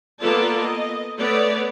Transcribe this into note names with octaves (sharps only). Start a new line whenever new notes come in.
A#3 B3 F4 A4 D5 A5
D#5
A3 B3 C#5 D5